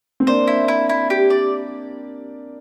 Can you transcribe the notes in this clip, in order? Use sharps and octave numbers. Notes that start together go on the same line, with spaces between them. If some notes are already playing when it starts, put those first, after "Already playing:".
C4
A#3 D4 C5
E4
E4
E4
G4
D5